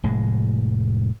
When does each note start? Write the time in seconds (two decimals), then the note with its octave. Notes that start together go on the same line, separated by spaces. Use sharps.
0.04 F1 A2 G#3